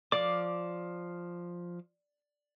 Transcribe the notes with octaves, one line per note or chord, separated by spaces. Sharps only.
F3 D5 F5 D6